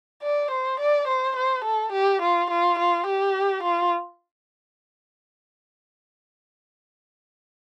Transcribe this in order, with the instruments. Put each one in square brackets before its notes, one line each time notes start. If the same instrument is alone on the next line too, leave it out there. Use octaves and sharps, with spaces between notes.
[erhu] D5
C5
D5
C5
C5
A4
G4
F4
F4
F4
G4
F4